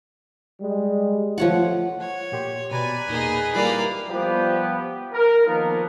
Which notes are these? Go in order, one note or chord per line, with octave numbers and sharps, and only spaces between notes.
G3 G#3
F3 A3 C#5 F#5
C#5 F#5
A#2 G4 C6
B2 B4 D5 G#5 A#5
E2 A#2 A#3 D#4 G#4
G3 A#3 E4 F4 D5 F5
F3 G3 B3 G4
A#4
D#3 F3 A#3 B3